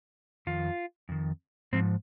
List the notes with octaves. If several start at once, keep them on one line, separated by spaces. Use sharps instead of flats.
F2 D#3 F4
F2 D#3
G#2 F3 C4